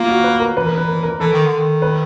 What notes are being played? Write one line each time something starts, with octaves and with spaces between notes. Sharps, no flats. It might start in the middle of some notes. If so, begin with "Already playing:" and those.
Already playing: A#3 F4
F#4
B4
A#4
E3 B4
A#4
B4
A#4
A#4
E3 A4
D#3
D3
D#3
B4